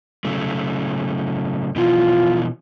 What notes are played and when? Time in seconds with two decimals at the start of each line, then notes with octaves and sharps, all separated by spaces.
0.25 C#3 F#3 A3
1.76 B2 E3 F3 F4